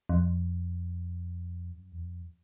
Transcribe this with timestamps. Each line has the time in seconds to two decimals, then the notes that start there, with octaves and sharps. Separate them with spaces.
0.09 F2
1.71 F#2
1.92 E2
1.98 F2